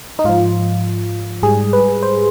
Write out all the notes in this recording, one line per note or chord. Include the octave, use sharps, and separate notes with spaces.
D#4
G#2 F3 F4
G#2 G3 G#4
B4
C5